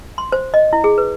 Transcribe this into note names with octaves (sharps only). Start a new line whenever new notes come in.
C6
C5
D#5
E4
G#4
B4